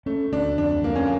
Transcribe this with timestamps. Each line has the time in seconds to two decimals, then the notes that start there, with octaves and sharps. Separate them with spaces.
0.06 A3 C#4
0.32 D2 D4
0.58 F2 D4
0.84 F2 A#3
0.95 C#4
1.03 A#3